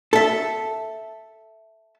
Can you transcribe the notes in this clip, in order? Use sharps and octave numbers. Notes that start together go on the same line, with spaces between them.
A4 E5